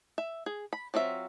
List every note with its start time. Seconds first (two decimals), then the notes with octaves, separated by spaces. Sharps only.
0.18 E5
0.46 G#4
0.73 B5
0.94 F#3 C4 F4 E5